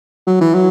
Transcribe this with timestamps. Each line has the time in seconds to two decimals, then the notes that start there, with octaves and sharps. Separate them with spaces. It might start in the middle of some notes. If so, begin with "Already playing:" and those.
0.27 F#3
0.41 E3
0.54 F#3